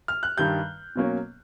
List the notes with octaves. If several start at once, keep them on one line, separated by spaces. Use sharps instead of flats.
F6
F#6
G2 D#3 G3 G6
B2 F#3 A#3 C#4